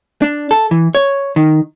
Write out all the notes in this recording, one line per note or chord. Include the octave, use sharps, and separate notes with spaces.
D4
A4
E3
C#5
D#3